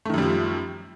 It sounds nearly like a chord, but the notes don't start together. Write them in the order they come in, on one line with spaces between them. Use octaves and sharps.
A3 D#3 F#2 G3 F3